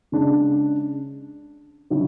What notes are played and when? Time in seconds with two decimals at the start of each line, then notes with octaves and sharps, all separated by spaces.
0.12 C#3 G#3 D4
1.90 D3 F#3 C#4 E4